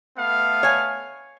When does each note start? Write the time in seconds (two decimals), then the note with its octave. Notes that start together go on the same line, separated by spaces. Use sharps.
0.17 A3 B3 F5
0.63 C#5 G#5